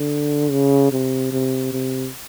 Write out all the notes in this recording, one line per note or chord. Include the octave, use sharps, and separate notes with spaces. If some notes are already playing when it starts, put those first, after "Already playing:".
Already playing: D3
C#3
C3
C3
C3